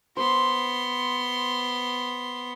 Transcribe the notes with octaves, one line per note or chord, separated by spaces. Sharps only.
B3 C5 C6